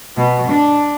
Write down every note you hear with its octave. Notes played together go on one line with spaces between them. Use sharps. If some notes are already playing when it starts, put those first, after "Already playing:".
B2
D4